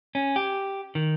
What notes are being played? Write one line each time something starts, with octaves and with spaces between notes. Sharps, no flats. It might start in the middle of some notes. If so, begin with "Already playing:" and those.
C#4
G4
D#3